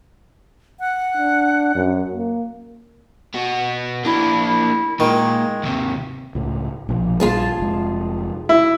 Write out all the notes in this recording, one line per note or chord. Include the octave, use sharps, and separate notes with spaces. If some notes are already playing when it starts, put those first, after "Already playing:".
F#5
D4
F#2
A#3
B3 F#4
A#3 D4 E4
A#2 D#3 G#3
D#2 C3
C#2 A2
A#1 B2 F3
A#1 G3 F4 G#4 A5
F1 G#3
E4